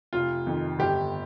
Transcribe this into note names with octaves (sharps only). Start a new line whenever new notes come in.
F1 F4
F2 D#3
G1 G4